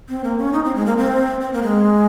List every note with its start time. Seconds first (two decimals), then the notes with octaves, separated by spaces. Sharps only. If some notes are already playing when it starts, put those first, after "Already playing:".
0.09 C4
0.24 A#3
0.39 C#4
0.53 D#4
0.64 C4
0.75 G#3
0.86 A#3
0.98 C4
1.41 C4
1.53 A#3
1.63 G#3